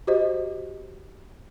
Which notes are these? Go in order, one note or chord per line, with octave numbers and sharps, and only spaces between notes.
F#4 G4 C5 D#5